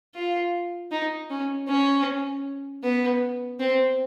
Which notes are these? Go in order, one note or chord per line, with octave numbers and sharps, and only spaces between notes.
F4
D#4
C#4
C#4
B3
C4